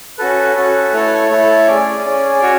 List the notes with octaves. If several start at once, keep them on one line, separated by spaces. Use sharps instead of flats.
C#4 F#4 A4 B4
C#4 F#4 A4
A3 E4 A4 C#5
A3 E4 A4
C#4 G#4 D5
C#4 G#4
C#4 F#4 C#5